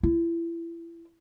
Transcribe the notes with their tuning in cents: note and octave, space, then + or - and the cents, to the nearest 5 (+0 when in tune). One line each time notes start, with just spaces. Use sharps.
E4 +30